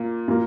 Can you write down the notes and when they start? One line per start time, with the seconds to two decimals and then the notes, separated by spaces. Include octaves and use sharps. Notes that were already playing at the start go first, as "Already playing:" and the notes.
Already playing: A#2 A#3
0.28 A#2 A#3